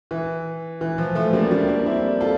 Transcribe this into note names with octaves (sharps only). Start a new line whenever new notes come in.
E3
E3
F3
F3 A3
G3 A#3
G3 A#3
A#3 D4
D4
C4 E4
F4 A4